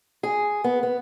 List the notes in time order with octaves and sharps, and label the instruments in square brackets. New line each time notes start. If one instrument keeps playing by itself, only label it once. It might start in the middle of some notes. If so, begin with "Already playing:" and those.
[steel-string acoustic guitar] G#4
B3
B3